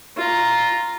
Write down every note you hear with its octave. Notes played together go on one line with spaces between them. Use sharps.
F4 A#5